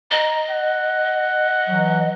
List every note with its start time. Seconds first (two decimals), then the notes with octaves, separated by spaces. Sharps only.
0.11 D#5 A#5
0.50 F#5
1.69 E3 F#3